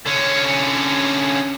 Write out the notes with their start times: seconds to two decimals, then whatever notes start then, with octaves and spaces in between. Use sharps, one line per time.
0.06 D3 C#4